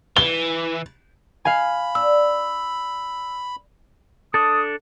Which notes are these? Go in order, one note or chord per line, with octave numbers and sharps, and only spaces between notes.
E3 G7
F5 G#5 B5
D4 E6
D4 A4 D#6